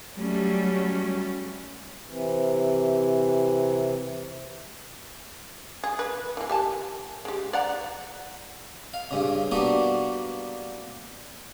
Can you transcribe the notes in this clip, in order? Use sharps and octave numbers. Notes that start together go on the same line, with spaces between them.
F#3 G3 A3 C#4
C3 E3
G#4
B4
E3 A#3
G4 G#5 A5
G#3 G4
D5 F#5 A#5
F5
G2 C#3
G3 A#3 B3 D4 F#4